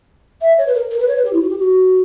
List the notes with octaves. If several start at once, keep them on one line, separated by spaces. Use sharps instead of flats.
E5
C#5
B4
A#4
A#4
B4
C#5
B4
G4
E4
F#4
G4
F#4